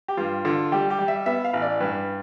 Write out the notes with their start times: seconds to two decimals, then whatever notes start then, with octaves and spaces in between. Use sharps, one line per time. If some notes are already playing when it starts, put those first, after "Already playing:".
0.08 G4
0.17 G2 F4
0.45 D3 F4
0.72 G3 G4
0.90 G4
0.99 G3
1.08 E5
1.26 B3 E5
1.45 F5
1.53 A1
1.62 D5
1.80 G2 B4